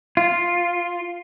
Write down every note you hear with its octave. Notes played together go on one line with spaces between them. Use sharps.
F4